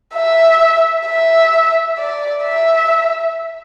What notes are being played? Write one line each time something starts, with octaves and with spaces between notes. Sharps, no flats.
E5
E5
D5
E5